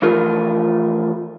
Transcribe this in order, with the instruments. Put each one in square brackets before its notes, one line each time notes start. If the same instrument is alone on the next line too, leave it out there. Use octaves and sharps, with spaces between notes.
[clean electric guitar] E3 F3 A3 F4 A#4